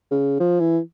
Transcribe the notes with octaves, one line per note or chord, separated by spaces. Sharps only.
C#3
F3
E3